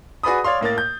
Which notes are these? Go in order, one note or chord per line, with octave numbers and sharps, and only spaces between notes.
F#4 G#4 B4 D5 B5 D#6
C#5 D5 F5 C6
A2 A#3 A#4 A6
G6